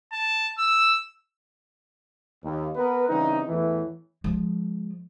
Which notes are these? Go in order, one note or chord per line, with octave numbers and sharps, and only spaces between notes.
A5
E6
D#2
B3 A#4 B4
C#3 E3 G3 C4 D#4
E2 A2 E3
F3 G#3